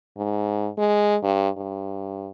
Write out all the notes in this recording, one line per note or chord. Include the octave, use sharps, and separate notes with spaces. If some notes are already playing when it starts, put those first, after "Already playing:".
G#2
G#3
G2
G2